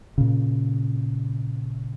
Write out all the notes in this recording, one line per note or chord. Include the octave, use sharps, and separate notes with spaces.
A#2 C#3